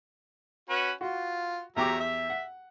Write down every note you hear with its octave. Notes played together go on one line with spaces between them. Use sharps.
C#4 F#4 B4
F4 F#4
E2 F#3 G4 E5 A#5 D6
E5
F#5